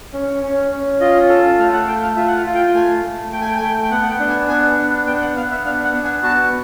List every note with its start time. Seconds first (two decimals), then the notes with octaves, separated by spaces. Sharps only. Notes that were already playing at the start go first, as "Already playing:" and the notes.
0.13 C#4
0.43 C#4
0.71 C#4
1.01 F4 D#5
1.29 A4
1.59 A3 F5
1.73 F#5
1.87 A3 G5
2.02 F5
2.16 F4 E5
2.27 F#5
2.36 F5
2.46 F4
2.55 G5
2.75 A3 G#5
3.03 A3
3.32 A3 G5
3.41 G#5
3.49 G5
3.56 G#5
3.61 A3 G5
3.83 G5
3.91 B3 F#5
4.03 F#5
4.10 G5
4.20 D4
4.29 G#5
4.48 B3 G#5
4.78 D4
5.07 B3 G5
5.22 F#5
5.36 B3 F5
5.51 E5
5.65 D4 F5
5.84 F#5
5.94 B3
6.04 G#5
6.23 F#4 A5